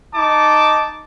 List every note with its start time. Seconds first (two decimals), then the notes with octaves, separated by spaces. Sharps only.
0.15 D#4 A5 D6